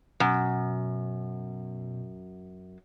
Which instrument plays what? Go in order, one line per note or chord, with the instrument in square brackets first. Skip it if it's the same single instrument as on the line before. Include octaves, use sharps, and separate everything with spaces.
[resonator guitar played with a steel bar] F#2 [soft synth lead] B2